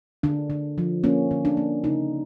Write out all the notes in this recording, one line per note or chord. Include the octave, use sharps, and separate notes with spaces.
D3 D4
D3
F3
A#3 C#4
D3
D4
A#3
C#3 D#4